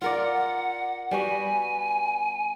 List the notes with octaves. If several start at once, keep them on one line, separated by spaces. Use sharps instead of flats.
F4 A#4 D5 F#5
G3 B3 F#4 G#5